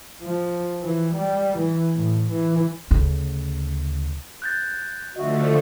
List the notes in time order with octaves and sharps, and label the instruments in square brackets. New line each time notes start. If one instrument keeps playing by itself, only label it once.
[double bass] F3
E3
G3
E3
A2
E3
[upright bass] D2 C#3
[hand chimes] F#6 G6 A6
[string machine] D3 F3 A3 [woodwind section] F#4 [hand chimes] D#5 E5